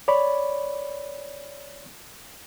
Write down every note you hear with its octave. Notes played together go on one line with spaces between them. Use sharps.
C#5 D5 B5